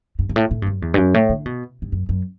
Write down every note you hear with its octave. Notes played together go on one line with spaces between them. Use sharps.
G2
G2
A2
A2
G2
F#2
E2
G2
F#2
A2
D3
B2
G2
F#2
F#2